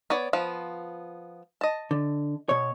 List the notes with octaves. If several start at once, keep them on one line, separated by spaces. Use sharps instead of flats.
B3 C#5 D5
F3 B3
D#5 A5
D3
B2 C#5